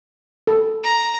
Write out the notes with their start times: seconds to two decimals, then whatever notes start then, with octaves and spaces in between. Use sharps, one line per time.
0.47 A4
0.84 A#5